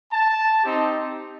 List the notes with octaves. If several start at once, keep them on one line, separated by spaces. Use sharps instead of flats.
A5
C4 D#4 G4